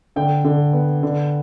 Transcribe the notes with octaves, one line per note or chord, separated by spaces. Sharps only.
D3 G5
D3
B3
D3